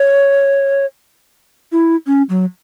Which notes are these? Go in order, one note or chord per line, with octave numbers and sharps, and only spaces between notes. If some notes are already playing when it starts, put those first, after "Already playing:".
Already playing: C#5
E4
C#4
F#3